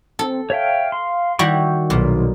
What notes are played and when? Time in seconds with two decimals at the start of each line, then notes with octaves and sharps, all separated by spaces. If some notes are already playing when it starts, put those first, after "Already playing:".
0.19 C4 A4
0.50 C#5 E5 F5 G5
0.92 C6
1.39 D#3 G3 E4 F#4 C#6 G6
1.90 B1 A#2